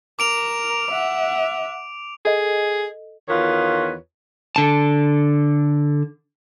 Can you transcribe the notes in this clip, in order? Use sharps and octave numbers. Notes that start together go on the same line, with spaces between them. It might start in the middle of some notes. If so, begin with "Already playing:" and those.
A#4 D6 D7 F7
E5 F#5
G#4 A4 D#5
E2 D#3 F4 F#4 B4 C#5
D3 A5